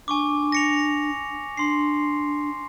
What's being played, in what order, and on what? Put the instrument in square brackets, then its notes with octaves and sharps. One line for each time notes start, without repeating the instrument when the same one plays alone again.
[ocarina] D4 [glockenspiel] G#5 C#6 D6
[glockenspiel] A#6 C#7 F7
[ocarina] D4 [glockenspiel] C6 C7